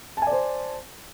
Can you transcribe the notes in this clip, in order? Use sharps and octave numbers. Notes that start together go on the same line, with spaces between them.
C5 D5 G#5 A5